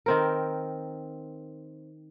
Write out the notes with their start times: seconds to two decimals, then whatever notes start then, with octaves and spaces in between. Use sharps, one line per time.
0.06 D#3 C4 A#4